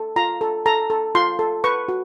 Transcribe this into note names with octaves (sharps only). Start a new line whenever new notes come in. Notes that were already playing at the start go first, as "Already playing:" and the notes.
Already playing: A4
F4 A#5
A4
A4 A#5
A4
F4 C6
A4
B4 C#6
F#4